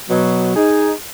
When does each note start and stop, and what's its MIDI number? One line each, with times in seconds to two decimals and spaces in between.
0.10 0.55 47
0.10 0.55 54
0.55 0.93 63
0.55 0.93 68